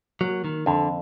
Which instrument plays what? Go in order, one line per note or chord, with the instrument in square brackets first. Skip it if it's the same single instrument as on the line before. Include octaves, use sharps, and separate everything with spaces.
[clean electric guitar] F#3 [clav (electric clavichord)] A#3
[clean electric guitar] D#3
[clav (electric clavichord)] F2 [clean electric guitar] D3